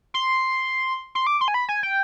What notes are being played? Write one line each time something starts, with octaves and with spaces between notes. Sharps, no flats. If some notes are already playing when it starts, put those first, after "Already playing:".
C6
C6
D6
C6
G#5
B5
G#5
G5